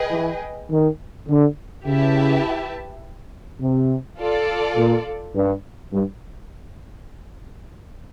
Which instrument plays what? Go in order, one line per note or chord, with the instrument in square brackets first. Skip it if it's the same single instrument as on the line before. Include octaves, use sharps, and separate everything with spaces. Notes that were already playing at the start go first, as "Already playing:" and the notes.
Already playing: [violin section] G#4 B4 D#5 G5
[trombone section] E3
D#3
D3
[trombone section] C#3 [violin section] E4 G4 B4 E5 A5
[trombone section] C3
[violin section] F4 A4 D5
[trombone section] A#2
G2
G2